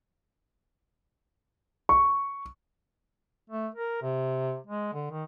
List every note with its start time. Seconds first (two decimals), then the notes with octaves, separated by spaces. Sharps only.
1.89 C#6
3.50 A3
3.75 A#4
4.02 C3
4.67 G#3
4.93 D3
5.11 D#3